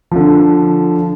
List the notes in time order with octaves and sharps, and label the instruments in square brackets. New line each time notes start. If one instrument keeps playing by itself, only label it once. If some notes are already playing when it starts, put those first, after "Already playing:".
[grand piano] D3 F3